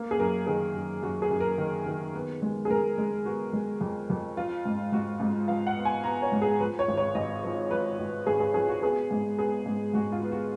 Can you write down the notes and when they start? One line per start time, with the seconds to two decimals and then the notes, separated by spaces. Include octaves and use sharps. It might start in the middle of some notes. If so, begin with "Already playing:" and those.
Already playing: A#3
0.11 G#4
0.19 F#2 A#4
0.46 D#3 G#4
0.75 F#2
1.02 F#2 F#4
1.22 G#4
1.31 F#2
1.40 A#4
1.58 D#3
1.86 D#3
2.15 B3
2.42 G#3
2.65 G#4
2.69 G#3 A#4
2.98 G#3
3.25 B3 F#4
3.53 G#3
3.81 F2
4.10 F2
4.37 F3 F4
4.65 G#2
4.92 G#2 F#4
5.20 G#2
5.48 F3 F5
5.67 F#5
5.76 B3
5.85 G#5
6.04 B3 A#5
6.22 C#5
6.32 G#2
6.42 G#4
6.60 F3 B4
6.79 C#5
6.88 G#1
6.98 C#5
7.15 G#1 D#5
7.44 F3
7.71 F3 B4
8.00 G#1
8.27 G#1 G#4
8.40 G#4
8.54 F3 G#4
8.68 F#4
8.82 B3 G#4
9.11 G#2
9.39 B3 G#4
9.66 G#2
9.94 G#2 F#4
10.12 F4
10.22 B3
10.31 F#4